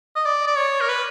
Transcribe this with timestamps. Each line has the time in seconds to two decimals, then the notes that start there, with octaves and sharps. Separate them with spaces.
0.16 D#5
0.26 D5
0.47 D5
0.57 C#5
0.81 A#4
0.89 B4